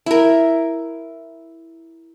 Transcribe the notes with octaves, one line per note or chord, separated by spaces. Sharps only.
E4 A#4